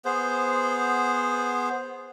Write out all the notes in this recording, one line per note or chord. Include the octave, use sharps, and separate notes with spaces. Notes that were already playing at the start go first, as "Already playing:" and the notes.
B3 G#4 C5